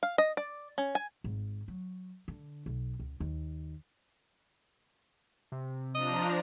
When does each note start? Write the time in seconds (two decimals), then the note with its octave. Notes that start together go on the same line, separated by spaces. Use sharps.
0.03 F5
0.18 D#5
0.37 D5
0.78 C#4
0.95 G#5
1.24 G#1
1.68 F#3
2.28 D3
2.66 B1
2.99 C#2
3.20 D#2
5.52 C3
5.95 F3 D4 D#5 A#5